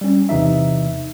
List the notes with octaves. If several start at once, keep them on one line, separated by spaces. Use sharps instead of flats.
G3 C#4
E2 C3 E3 D#4 E5